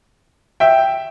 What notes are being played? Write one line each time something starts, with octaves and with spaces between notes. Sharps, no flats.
E5 G5